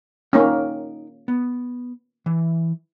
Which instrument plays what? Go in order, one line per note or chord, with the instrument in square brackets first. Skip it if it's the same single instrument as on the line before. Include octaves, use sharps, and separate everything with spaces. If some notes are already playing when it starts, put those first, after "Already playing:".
[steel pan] A#3 C#4 [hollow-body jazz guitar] D#4 G5
[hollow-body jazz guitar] B3
E3